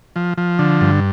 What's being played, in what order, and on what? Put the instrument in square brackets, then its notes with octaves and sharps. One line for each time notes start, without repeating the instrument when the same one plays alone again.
[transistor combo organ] F3
F3
D3
G2